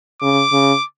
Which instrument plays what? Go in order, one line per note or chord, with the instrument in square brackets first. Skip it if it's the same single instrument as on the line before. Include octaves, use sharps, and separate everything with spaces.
[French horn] C#3 [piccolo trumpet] D6
[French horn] C#3